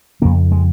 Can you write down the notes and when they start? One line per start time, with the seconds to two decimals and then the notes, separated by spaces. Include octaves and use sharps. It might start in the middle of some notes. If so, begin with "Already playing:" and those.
0.22 F2 C#3 A#3
0.52 G#3